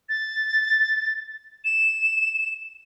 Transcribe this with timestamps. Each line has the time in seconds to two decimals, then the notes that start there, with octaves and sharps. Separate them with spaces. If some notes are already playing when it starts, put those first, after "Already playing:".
0.09 A6
1.65 E7